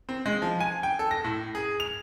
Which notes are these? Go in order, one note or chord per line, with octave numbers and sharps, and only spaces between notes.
C4
G#3
F3
G#5
G5
A4
A#6
A2
G#4
F7